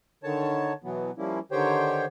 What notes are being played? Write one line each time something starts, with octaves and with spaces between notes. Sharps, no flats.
D3 D#3 C#5 A5
B2 E3 F#3 B3
F3 G3 A#3 C#4 E4
D3 D#3 G4 C5 C#5 G5